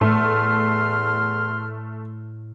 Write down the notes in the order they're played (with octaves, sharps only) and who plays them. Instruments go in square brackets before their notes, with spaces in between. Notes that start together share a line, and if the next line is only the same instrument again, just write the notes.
[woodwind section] E2 C6 F6 [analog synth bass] A2 [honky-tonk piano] A3